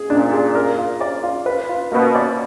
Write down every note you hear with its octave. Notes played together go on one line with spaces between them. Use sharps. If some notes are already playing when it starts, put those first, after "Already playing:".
Already playing: G#4
A#2 D4
G#4
A#4
F4
D5
F4
B4
F4
B2 A#3
D5